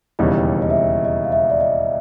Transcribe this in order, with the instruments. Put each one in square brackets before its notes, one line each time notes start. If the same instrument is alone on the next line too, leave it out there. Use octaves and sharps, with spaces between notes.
[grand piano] E1 D#2 C#3 E3 G3 [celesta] D#5
[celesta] D#5
E5
D#5
D#5
F5
E5
D5
D#5